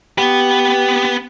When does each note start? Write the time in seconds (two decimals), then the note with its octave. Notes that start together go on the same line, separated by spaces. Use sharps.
0.18 B3 G4 B4